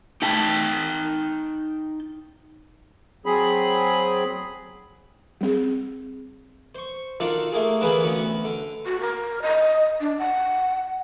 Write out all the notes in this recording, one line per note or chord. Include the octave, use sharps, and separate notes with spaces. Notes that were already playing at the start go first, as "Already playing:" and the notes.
D#4 G5 A5
F#3 C4 G#4 B5
G3 C4 G#4
C5 C#6
D#3 D4 F4 F#4 A4
A3 A#3 G#4
D3 E3 A#3 B3 G#4 B4
D2 B3 C#4 F#4
D3
F#4
A#4
D#5
D4
F#5